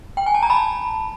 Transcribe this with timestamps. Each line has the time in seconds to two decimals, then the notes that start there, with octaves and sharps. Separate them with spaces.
0.17 G5
0.26 G#5
0.34 A5
0.43 A#5
0.50 A5 B5